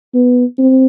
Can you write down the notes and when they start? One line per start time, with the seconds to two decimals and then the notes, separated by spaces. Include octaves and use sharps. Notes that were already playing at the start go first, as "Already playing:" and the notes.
0.15 B3
0.58 C4